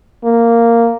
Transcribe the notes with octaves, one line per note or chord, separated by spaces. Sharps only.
A#3